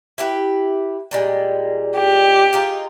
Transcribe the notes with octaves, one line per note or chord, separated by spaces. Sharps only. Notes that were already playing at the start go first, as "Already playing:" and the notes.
E4 G4 B4
A#2 G3 G#3
G4
D#4 F4 G#4